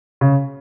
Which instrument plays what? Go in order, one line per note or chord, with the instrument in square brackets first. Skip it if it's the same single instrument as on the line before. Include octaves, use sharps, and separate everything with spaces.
[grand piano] C#3